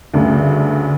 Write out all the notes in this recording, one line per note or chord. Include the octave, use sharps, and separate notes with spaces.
D2 G2 C#3 A3